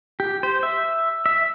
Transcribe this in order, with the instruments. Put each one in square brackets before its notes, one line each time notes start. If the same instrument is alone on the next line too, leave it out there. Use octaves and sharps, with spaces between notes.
[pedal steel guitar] G4
C5
E5
E5